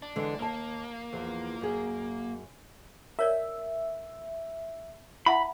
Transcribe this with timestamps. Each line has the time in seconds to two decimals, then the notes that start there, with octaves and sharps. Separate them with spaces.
0.02 D4
0.16 D3 E3 G#3
0.39 D#2 A#3 A5
1.13 E2 F3
1.61 F#2 G#4
3.19 A#4 C#5 D5 E5
5.26 E4 E5 F#5 B5